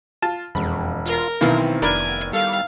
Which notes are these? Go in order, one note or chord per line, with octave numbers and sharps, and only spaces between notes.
F4 A5
E1 F2 B5
F4 A#4
B1 D#3 E3 B3 C4 E4 F5
F1 D4 A#4 G#5 B5
G3 A4 F5